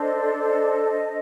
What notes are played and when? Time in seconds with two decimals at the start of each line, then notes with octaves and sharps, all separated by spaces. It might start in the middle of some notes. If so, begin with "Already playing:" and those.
Already playing: D4 A4 C5 D#5
0.43 D#5